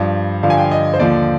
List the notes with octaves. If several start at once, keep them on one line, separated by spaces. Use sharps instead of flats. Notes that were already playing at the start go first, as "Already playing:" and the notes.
Already playing: G2 F3
G2 D3 F3 F5
G#5
G5
F5
D#5
C5
D#2 D3 F3 D5